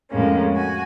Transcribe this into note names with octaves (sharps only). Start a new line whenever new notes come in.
F2 A2 G#3 A#3 C#4
F#4 G#5